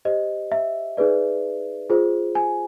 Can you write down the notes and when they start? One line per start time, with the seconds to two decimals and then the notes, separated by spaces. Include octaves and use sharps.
0.05 G4 C5 D#5
0.52 E5
0.97 D#4 G#4 B4 D5
1.90 F4 G#4 C5
2.35 G#5